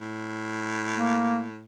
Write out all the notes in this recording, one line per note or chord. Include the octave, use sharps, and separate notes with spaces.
A2
A#3